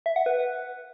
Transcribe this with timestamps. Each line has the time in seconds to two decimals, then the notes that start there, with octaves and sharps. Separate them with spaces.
0.06 E5
0.16 F#5
0.26 B4